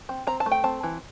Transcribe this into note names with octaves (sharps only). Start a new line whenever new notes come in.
C4
C4 A#5
A5
A3
G5
C4 A5
E3